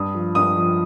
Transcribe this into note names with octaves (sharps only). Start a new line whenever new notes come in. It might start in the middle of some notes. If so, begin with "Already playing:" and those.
Already playing: G2 D#6
F3
G2 D#6
F3